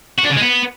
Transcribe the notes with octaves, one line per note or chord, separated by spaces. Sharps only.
F#4
D4
C#3
G#3
B3